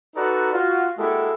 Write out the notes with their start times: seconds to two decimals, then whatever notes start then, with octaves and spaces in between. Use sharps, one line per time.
0.15 D#4 F#4 A4 B4 D5 A#5
0.53 F4 F#4
0.98 G#3 A#3 E4 F#4 G4 A4